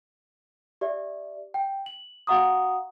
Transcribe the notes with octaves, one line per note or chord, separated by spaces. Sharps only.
G4 D5 E5
G5
F#7
F#4 F5 F#5 A#5 C#6 D#6